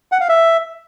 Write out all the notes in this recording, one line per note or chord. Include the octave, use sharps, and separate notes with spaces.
F#5
F5
E5